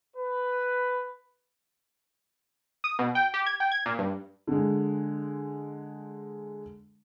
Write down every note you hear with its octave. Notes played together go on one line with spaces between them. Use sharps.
B4
D#6
B2
G5
G4
G#6
G5
G#6
A#2
G2
D3 G#3